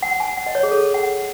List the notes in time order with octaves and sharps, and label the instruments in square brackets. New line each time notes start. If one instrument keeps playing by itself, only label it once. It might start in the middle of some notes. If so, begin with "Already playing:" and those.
[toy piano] F#5
G#5
F#5
D#5
C#5
G#4
A4
F#5